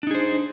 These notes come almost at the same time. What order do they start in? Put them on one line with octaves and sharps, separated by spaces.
D4 D#4 G#4 C5